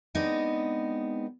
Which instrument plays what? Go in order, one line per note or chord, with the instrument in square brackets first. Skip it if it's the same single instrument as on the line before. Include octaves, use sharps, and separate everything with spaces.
[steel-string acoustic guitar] G#3 B3 C4 D4 D#4